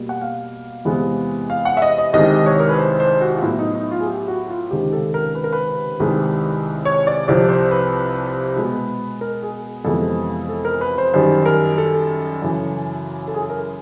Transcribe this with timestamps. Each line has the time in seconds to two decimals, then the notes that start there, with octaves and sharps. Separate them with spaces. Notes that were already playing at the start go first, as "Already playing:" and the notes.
Already playing: B2 G3 A#3
0.09 F#5
0.21 F5
0.85 E2 C3 E3 G#3 B3
1.50 F5
1.65 F#5
1.77 E5
1.82 D#5
1.98 D#5
2.13 C2 C3 D#3 G#3 D#5
2.46 C#5
2.60 A#4
2.69 B4
2.78 C5
3.00 C5
3.21 F#4
3.37 F4
3.42 A2 F#3 B3 E4
3.59 D#4
3.75 D#4
3.91 F4
4.00 G#4
4.07 G4
4.28 F#4
4.49 F4
4.71 C#2 C3 D#3 G#3 G4
4.93 A4
5.14 A#4
5.35 B4
5.44 A#4
5.53 B4
6.00 C2 C3 D#3 G#3
6.85 C#5
7.07 D5
7.28 C2 C3 F3 D5
7.49 C5
7.71 B4
8.56 B2 G#3 B3
9.21 A#4
9.42 G#4
9.84 F2 C3 E3 G#3 B3 A4
10.49 A4
10.65 A#4
10.81 B4
10.98 C5
11.13 F#2 D#3 G3 C5
11.46 A#4
11.78 A4
12.42 F#2 C#3 E3
13.28 A4
13.35 G#4
13.42 A4
13.50 A#4